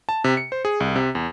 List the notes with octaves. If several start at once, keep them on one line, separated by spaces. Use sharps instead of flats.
A5
C3
C#7
C5
G#4
C2
C3
E2